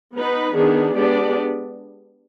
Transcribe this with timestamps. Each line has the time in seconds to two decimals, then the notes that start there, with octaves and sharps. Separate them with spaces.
0.14 B3 D#4 B4
0.54 D#3 B3 D4 G#4
0.94 G#3 B3 D4 G4 D5